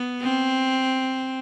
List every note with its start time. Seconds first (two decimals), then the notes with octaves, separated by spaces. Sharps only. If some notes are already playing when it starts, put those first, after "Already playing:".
Already playing: B3
0.22 C4